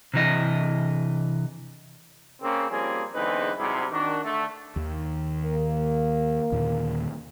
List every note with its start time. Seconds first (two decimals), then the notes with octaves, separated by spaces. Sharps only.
0.14 C3 E3 D#5
2.41 C#3 A#3 C4
2.70 F3 G3 A#3 C4 C#4 G#4
3.15 E2 D3 G#3 C4 D#4 B4
3.58 G#2 C3 F#3 G3 E4 G#4
3.91 D#3 D4 F#4
4.24 D3 A3
4.76 D#2 D#3
5.41 A#3
6.52 D#2 A#2 D3